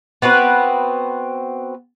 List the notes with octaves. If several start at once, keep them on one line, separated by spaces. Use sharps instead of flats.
B3 C4 F#4 B4